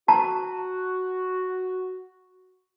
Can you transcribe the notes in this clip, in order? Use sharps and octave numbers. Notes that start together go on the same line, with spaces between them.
F#4 A5 A#5